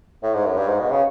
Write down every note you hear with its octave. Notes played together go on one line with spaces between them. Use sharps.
A2
G#2
F#2
G2
G#2
B2
C#3